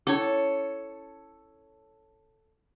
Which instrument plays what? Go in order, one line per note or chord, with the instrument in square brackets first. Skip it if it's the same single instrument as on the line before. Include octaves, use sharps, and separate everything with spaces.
[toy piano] C#4 E4 D6 [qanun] A4 C#5